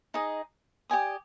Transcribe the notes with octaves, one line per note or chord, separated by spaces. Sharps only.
D#4 G#4 D#5
G4 D5 G#5 D#6